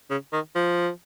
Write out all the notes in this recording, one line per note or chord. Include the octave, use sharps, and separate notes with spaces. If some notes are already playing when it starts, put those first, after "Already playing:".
C#3
D#3
F3